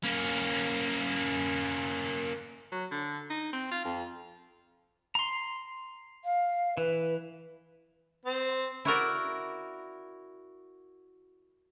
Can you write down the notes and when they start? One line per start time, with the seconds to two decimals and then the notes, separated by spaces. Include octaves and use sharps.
0.03 A#3 C#4
2.72 F#3
2.91 D3
3.30 D#4
3.53 C4
3.71 F4
3.85 F2
5.15 A#5 C6
6.25 F5
6.77 E3 B4
8.25 C4
8.85 E4 F#4 A#4 D5